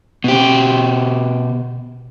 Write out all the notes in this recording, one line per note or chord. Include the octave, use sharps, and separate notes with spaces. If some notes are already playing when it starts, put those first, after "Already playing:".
B2 G4